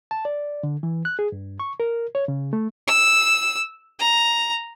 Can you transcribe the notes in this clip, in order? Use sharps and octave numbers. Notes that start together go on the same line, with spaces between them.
A5
D5
D3
E3
F#6
G#4
G2
C#6
A#4
C#5
C#3
A3
E6
A#5